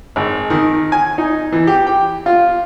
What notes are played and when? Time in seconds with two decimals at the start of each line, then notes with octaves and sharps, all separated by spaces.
0.16 G#1
0.50 D#3
0.92 G#5
1.18 D#4
1.52 E3
1.67 G4
1.87 G5
2.26 F4